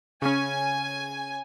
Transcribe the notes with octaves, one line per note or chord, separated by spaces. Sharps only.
C#3 C#4 G#5